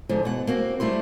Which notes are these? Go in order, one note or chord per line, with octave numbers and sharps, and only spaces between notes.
G#2 D3 F3
B2 F#5
A#3 C4 F#4
G3 A3 E4 C5